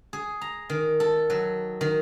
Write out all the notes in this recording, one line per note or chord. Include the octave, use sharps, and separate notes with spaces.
G#4
A#5
D#3
A4
F#3
D#3